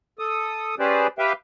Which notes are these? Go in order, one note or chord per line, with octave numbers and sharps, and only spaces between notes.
A4 D#6
C#4 G4 G#4 B4 C5 D5
G4 B4 E5 F5 G5